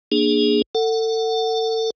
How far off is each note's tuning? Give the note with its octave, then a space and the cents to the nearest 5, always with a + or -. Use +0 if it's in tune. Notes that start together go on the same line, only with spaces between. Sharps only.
A#3 +25 D4 +35 G#4 +0
A4 +30 F#5 +0